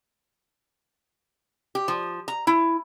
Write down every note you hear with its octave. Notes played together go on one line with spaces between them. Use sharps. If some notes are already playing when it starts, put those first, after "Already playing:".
G4
F3
A#5
E4